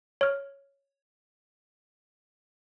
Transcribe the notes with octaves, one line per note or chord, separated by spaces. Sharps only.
C#5 F6